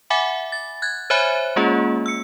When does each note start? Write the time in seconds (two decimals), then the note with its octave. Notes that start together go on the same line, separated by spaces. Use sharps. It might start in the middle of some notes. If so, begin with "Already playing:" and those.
0.10 E5 F#5 G#5 B5 D6
0.52 A6
0.82 F#6 G#6 A6
1.10 C5 C#5 E5 G#5 B5 F#6
1.56 G#3 A#3 C#4 F4 G#4
2.06 E6 C#7